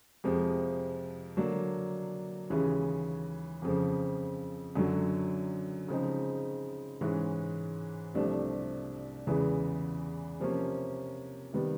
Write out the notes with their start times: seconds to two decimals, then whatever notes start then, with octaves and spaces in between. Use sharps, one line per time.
0.24 F2 C3 F3 G#3
1.37 D3 F#3 A#3 D4
2.50 D#2 C#3 E3 G#3 C#4
3.62 F2 C#3 F3
4.75 F#2 D3 F#3
5.88 C#3 F3 G#3 C4 D#4
7.01 G#2 E3 G#3 C#4
8.14 C2 C3 F3 A3 D4
9.27 E2 C#3 E3 G#3 B3
10.40 C3 F3 A#3 C#4
11.53 C3 D#3 G3 B3